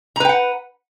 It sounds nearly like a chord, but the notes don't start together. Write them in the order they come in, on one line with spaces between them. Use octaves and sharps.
A#5 B4 G5 F#5